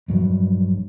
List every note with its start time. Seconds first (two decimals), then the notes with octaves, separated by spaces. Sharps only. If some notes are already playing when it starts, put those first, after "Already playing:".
0.08 A#1 G2 F#3